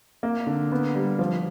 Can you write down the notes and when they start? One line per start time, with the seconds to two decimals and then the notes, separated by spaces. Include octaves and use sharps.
0.23 A#3
0.47 D3
0.72 B3
0.95 G3
1.19 F3